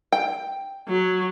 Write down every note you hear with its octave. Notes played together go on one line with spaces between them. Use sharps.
G5
F#3